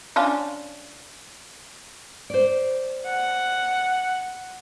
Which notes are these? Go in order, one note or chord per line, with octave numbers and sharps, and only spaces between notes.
C#4 D4 F4
C5 D5
F#5